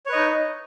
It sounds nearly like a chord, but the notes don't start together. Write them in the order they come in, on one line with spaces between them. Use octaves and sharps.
C#5 B4 D#5 D#4